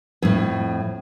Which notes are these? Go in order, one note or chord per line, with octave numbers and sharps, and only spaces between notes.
F2 A2